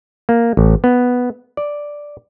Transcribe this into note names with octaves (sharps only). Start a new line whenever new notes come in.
A#3
A1
B3
D5